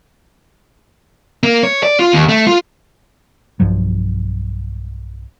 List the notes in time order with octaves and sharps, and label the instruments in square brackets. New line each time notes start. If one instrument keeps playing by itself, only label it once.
[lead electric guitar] A#3
C#5
D5
F4
D#2
A3
F4
[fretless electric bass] B1 G2 F3 F#3